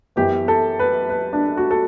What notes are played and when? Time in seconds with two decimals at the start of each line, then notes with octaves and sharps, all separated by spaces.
0.16 F#2 E3 B3 G4
0.48 A4
0.79 B4
1.10 B4
1.33 D4
1.57 F#4
1.71 A4